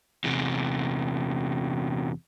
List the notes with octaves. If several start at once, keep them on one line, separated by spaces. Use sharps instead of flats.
E2 C3